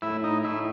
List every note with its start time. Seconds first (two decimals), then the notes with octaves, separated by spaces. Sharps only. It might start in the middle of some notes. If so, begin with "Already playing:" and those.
0.02 A2 E4
0.24 D#4
0.44 A2 E4